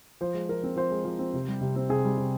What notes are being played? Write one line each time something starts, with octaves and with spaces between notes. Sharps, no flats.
F3 C5
G#3
F3 A#4
C4
F3 C5
G#3
F3
C4
C3
G3
C3
C4
C3 G#4
G3
C3